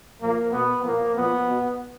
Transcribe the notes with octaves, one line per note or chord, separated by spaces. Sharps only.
A#2 F3 A#3
B2 B3
A#2 F3 A#3
A#2 F3 B3
B2